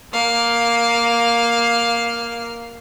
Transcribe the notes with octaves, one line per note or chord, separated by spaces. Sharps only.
A#3 F5